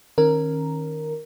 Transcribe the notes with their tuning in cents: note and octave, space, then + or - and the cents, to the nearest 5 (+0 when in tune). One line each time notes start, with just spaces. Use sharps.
D#3 +0 C#4 -30 A#4 +0